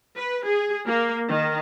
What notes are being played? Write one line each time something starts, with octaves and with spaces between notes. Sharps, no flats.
B4
G#4
A#3
D#3